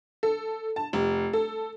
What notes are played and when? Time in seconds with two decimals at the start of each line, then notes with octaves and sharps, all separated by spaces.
0.23 A4
0.76 A5
0.93 F1
1.33 A4